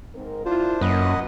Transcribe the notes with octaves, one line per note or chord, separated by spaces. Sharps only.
G#2 C4 A#4
D4 E4 F4 C5
F#2 A#3 B4 D#5 F#5